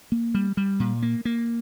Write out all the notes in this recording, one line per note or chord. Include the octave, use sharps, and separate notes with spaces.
A#3
G3
G3
A#2
A#3
A#3